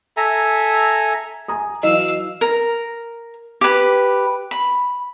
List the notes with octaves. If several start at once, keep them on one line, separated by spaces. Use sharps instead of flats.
A4 E5 G#5 A#5
G#5 A#5 D#6
E3 F#3 D#5 F5 E6
A#4
G4 B4
B5